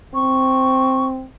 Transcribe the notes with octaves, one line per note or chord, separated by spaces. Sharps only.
C4 C#6